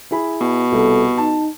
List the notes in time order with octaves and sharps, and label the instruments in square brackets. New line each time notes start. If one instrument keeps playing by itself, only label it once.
[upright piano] E4 G#4 B5
[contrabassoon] B2
[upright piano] C2 [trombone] A4
[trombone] D#4 [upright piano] A5